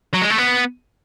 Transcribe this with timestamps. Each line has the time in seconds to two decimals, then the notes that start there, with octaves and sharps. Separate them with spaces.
0.14 F#3
0.22 G#3
0.30 A3
0.38 B3